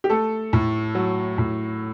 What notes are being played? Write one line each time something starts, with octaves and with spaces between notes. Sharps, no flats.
G4
A3 A4
A2
F#3
A2